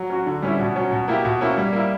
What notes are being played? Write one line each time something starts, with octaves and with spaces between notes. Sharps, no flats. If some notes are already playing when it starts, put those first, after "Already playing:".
Already playing: F#3
C#4 F#4
D3
G3 C#4 E4
B2
F#3 C#4
B2
A#3 E4 G4
B2
A#3 C#4 E4
G3
A#3 E4